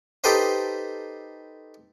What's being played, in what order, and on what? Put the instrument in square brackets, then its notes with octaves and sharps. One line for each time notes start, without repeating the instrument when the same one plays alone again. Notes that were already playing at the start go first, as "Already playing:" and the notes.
[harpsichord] D#4 G4 A4 B4 C5 D#5